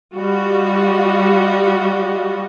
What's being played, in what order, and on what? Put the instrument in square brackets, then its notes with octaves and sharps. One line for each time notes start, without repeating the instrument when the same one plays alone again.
[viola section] G3 F4 F#4 D#5